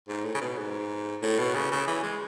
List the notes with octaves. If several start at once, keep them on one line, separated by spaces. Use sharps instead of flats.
G#2
A2
C#3
B2
G#2
A2
B2
C#3
C#3
E3
G#3